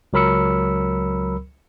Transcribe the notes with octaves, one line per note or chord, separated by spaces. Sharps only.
C#2 F#3 A#4 B5 E6 C#7